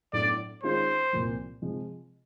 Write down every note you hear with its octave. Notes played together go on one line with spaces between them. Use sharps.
A2 F#3 B3 D4 D5
D#3 G#3 C#4 F4 G#4 C5
C2 A#2 F3
C3 F3 G#3